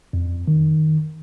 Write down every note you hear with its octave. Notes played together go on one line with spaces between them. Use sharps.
F2
D#3